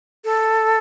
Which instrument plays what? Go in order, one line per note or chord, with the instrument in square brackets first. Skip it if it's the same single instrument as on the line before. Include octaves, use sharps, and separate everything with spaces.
[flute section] A4